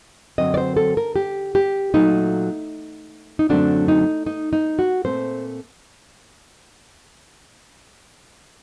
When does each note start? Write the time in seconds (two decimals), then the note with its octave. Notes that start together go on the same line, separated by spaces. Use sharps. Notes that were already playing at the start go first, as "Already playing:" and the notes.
0.38 F#2 D3 F#3 C4 D#5
0.54 D5
0.57 C5
0.77 A4
0.97 A#4
1.16 G4
1.55 G4
1.94 A#2 F#3 A3 D#4
3.39 D#4
3.49 F#2 D3 F#3 A3 C4 D4
3.88 D#4
4.26 D#4
4.53 D#4
4.79 F#4
5.05 A#2 A3 C4 C5